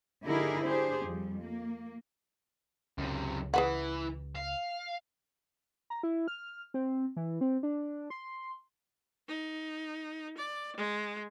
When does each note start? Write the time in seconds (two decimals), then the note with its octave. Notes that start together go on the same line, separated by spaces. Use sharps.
0.24 D3 D#4 E4 G4 G#4 A#4
0.64 D4 G4 G#4 C5
1.02 F2 G3
1.42 A#3
2.98 C#2 F#2 C3
3.54 E3 G#4 B4 F#5
4.35 F5
5.90 A#5
6.03 E4
6.28 F6
6.74 C4
7.17 E3
7.41 C4
7.63 D4
8.10 C6
9.28 D#4
10.38 D5
10.76 G#3